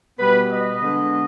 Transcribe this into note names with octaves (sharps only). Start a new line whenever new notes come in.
B2 G3 B3 B4
D#5
D3 G#3 B3